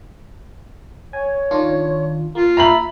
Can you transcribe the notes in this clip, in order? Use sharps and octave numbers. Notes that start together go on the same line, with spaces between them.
C#5 G#5
D#3 D4 F4
A#3 F4
E5 A#5 B5 F#7